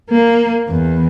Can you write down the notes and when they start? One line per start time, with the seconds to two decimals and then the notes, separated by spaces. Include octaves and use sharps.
0.10 A#3
0.68 E2